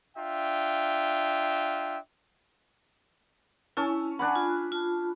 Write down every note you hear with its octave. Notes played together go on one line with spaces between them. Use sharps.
D4 F4 E5 G5
C#4 E4 A5
D4 F#5 G#5 B5
F4
F4 A5